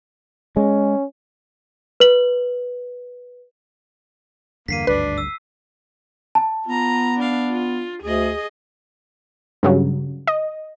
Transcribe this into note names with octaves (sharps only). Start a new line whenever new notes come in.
G#3 C#4
B4 F#7
E2 G2 D3 A#3 B6 C7 D#7
G#1 D2 G2 D4 B4
E6
A5
B3 F4 A#5
D4 F5
F4
D2 G#4 D#5
G2 C#3 F#3
D#5